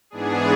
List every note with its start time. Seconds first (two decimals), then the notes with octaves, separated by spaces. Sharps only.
0.10 G#2 E3 B3 D4 G#4